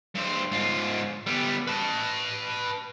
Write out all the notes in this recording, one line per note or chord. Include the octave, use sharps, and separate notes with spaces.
G2 C5
G#2 F4
G3 B3
B4 A5